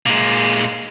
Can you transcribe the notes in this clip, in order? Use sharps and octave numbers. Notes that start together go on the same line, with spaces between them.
A#2 G#3